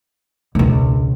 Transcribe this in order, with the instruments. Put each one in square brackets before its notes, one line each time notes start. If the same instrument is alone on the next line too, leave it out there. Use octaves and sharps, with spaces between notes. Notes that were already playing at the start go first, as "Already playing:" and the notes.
[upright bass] E1 C#2